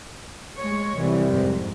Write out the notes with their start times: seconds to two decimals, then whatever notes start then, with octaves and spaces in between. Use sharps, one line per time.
0.57 G#3 C#5
0.96 C2 E3
1.27 F2 G#2